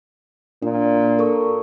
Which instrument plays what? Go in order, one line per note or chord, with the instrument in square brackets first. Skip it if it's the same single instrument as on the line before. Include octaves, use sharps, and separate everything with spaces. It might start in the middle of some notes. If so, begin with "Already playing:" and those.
[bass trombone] A#2 [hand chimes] D4
[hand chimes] A4 A#4 C#6